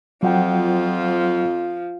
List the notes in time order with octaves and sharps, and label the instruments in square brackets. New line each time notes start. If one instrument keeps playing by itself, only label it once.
[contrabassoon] F2 [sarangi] F3 [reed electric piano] F#3 F#5 G5